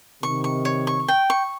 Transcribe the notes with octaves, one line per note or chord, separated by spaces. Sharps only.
C3 D#3 C#6
C#6
C#5
C#6
G5
C#6